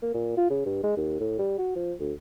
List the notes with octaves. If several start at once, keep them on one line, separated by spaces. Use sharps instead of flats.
A#3
A#2
F4
C#3
G2
G#3
D#2
A2
G3
F#4
F3
D2